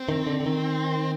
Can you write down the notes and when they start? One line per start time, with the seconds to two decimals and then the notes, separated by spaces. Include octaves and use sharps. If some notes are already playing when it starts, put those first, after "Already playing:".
Already playing: C4
0.09 D#3
0.27 D3
0.40 D3
0.46 D#3